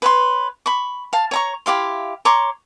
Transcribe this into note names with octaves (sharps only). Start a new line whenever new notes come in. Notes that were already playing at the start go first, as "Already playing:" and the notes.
B4 C#5 C6
B5 C#6
F5 A5
C#5 A#5 C#6
E4 G4 F5 C6
C#5 A#5 C6 D6